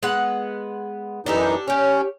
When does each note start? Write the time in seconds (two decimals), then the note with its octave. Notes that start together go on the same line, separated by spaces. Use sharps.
0.03 G#3 B3 F#5
1.26 F#2 E3 D4 D#4 G4 A4
1.68 C#4 G4 C#5